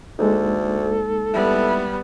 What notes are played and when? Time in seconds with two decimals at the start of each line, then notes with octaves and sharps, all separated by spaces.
0.19 D2 G#3 A#3 D#4 A4
1.34 G3 B3 E4